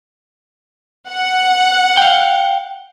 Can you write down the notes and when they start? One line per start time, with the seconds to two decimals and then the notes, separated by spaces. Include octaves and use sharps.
1.09 F#5
1.97 F5 G5